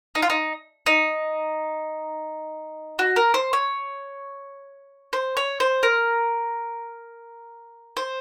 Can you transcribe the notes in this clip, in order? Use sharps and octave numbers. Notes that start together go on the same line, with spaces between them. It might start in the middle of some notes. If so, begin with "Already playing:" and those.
D#4
F4
D#4
D#4
F#4
A#4
C5
C#5
C5
C#5
C5
A#4
C5